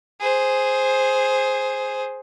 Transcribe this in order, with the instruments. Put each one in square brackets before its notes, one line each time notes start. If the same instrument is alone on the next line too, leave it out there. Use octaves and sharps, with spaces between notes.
[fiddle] G#4 C5